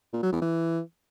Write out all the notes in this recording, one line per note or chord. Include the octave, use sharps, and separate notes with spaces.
A#2
F#3
E2
E3